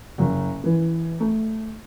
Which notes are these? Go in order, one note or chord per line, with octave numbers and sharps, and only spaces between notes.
F#1
E3
A3